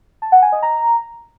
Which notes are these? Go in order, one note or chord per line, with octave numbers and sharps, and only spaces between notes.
A5
F#5
G#5
D#5
A#5